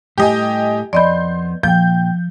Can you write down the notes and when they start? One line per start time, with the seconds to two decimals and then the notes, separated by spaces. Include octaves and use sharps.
0.18 A2 G3 A3 G4 D#5 G#5
0.93 F2 B3 D5 D#5 B5 C6 G6
1.63 A#2 F3 G5 G6